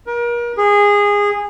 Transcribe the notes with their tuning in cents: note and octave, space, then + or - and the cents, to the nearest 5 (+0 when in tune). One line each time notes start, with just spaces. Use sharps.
A#4 +35
G#4 -20